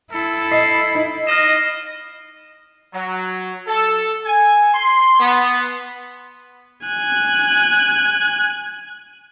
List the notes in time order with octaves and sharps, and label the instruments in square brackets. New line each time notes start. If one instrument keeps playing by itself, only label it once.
[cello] E4 [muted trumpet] A4
[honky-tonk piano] D#5 [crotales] C7
[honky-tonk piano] D#4
[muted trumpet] D#5 [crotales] F6 A#6 E7
[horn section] F#3
A4
G#5
C6
B3
[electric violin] G#5 F#6